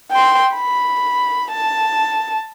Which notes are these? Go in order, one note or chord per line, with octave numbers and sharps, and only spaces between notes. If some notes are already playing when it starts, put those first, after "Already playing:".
G5 C6
B5
A5